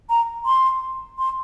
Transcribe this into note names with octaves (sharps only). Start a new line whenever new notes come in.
A#5
C6
C6